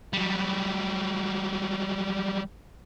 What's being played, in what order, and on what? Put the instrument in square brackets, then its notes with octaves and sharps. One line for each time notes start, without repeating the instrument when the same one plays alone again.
[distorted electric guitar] F#3 G3